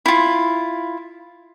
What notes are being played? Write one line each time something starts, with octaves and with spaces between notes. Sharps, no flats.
E4 F4